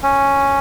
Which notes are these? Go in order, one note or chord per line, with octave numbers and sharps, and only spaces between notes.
C#4